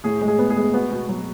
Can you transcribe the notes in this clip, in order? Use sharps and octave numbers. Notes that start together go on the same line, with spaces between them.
A2 G#4
G#3
G#4
B3
G#4
G#3
B3 F#4
B2
F#3